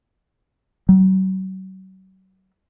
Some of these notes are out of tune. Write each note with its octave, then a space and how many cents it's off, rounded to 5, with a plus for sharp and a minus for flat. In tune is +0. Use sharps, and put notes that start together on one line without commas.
F#3 +40